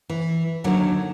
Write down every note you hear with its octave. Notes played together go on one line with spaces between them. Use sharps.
E3
D#2 D3 D#3 F#3 C#4